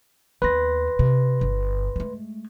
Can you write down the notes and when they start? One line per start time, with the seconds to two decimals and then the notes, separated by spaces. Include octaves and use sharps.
0.42 D#2 B3 B4 C6 A#6
0.99 C3
1.41 G1
1.96 G#3 A3